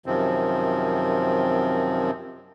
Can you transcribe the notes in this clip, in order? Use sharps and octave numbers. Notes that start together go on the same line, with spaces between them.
F#2 C3 D#3 F3 C4